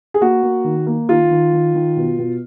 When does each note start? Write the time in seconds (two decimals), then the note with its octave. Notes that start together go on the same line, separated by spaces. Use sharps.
0.14 G#4
0.21 A#3 F#4
0.43 A#3
0.64 D#3
0.87 A#3
1.09 D#3 F4
1.31 D#3
1.53 D#3
1.74 D#3
1.97 B2
2.19 B2